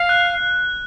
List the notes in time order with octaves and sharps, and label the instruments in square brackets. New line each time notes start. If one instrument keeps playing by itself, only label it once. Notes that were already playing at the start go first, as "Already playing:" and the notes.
Already playing: [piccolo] F5
[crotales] F#6